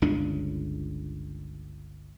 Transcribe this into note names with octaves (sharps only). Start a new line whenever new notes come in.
G1 C#2 C#3 D4